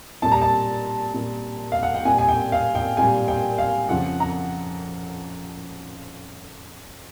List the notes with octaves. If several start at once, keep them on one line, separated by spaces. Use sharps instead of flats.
A#2 G3 A5
A#5
A5
A#2 G3
F5
F#5
G5
A#2 G3 G#5
G#5
G5
F5
G5
A#2 G3 G#5
G5
F5
F2 C#3 F3 F#5
A#5